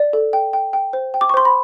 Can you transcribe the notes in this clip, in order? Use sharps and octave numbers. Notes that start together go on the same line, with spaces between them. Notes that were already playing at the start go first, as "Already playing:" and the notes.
Already playing: D5
A4
G5
G5
G5
C5
G5
D6
C#6
C5 C6
B5